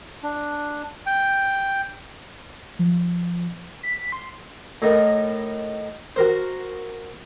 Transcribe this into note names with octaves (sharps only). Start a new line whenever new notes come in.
D4
G5
F3
B6
C6
A2 D#4 A#4
F#4 A#4 C5